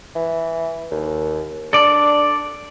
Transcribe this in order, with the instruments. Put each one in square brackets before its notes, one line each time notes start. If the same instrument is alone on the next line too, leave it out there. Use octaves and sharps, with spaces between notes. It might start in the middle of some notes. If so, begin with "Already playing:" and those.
[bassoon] E3
D#2
[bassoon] D4 [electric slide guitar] A4 D5